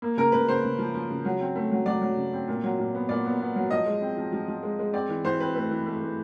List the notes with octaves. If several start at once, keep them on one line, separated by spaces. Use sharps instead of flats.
A#3
C#3 A#4
C#3 B4
C#3 C5
C#3
F3
F3
C#3
F#3
C4
A3
F#3
F#3 D5
F#3
C#3
C4
A#2
F#3
A#2
B3
A#2 D5
B3
B3
F#3
F3 D#5
G#3
C4
F3
F3
F3
G#3
G#3
C4 D5
E3
E3 C5
C4 B4
A3 B4
E3
A3
E3